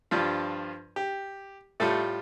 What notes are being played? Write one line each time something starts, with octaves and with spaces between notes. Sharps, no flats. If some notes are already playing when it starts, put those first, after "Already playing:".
G2 F3 D4 F4
G4
A2 G3 A3 F4 A4